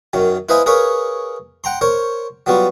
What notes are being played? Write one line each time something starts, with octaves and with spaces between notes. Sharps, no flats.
F#2 D#3 F#3
E4 B4 C5 D#5 F5 G#5
G#4 A#4 B4 C#5 F5
F#5 G5 A#5 C6
A#4 C5 C#5
F#3 G3 B3 F4 F#4